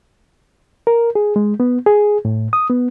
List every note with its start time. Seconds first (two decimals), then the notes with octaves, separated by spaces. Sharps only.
0.87 A#4
1.15 G#4
1.36 G#3
1.60 B3
1.86 G#4
2.25 A2
2.53 D#6
2.70 B3